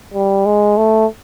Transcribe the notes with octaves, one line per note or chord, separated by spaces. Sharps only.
G3
G#3
A3